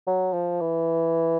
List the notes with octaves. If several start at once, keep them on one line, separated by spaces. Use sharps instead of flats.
F#3
F3
E3